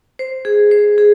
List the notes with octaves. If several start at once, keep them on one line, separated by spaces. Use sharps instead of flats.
C5
G#4
C5
G#4